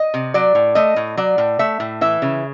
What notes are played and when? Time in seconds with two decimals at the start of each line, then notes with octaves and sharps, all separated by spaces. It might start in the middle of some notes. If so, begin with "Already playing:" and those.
Already playing: D#5
0.14 C3
0.34 F#3 D5
0.55 A2
0.75 A3 D#5
0.96 A2
1.17 F#3 D5
1.38 A2
1.59 A3 E5
1.80 A2
2.01 E3 E5
2.22 C#3